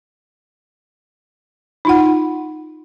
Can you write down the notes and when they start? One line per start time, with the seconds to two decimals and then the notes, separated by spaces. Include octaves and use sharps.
1.85 D#4 F4 F#5